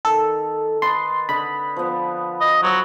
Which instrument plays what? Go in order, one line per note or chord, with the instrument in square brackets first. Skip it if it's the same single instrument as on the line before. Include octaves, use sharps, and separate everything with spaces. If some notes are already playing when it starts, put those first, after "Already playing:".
[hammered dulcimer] D#3 [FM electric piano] A4
[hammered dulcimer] B4 D#5 A5 [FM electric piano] C6
[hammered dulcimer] D3 D#5 [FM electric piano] B5
[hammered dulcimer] F3 B3
[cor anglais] D#5
[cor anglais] F#3 [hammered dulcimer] A4 C5